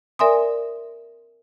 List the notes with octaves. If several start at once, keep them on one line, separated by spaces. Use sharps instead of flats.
A#4 D5 E5 G#5 C6 D#6